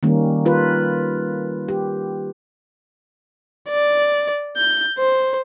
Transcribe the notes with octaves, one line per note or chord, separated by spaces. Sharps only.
D#3 G3 A#3 C#4
F4 B4
G4
D5
G6
C5